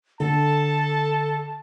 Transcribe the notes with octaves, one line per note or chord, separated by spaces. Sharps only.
D3 A4 A5